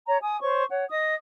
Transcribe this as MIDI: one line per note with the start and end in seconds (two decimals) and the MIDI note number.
0.08 0.18 73
0.08 0.18 82
0.22 0.40 80
0.22 0.40 87
0.41 0.64 72
0.41 0.64 73
0.41 0.64 85
0.70 0.84 73
0.70 0.84 78
0.90 1.14 75
0.90 1.14 87